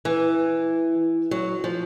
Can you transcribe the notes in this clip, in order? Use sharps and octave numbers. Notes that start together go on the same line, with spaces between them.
E3
F#3
F3